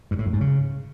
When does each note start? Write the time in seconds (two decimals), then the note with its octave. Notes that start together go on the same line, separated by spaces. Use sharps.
0.11 G2
0.18 A2
0.26 F#2
0.33 G#2
0.41 C#3